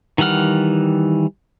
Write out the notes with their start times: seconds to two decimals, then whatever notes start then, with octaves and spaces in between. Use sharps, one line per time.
0.18 D#3 E3 G3 F#5 F6